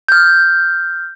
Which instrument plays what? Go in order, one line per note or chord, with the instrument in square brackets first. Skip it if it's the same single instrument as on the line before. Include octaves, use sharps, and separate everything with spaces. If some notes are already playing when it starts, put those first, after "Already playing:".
[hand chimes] F6 G6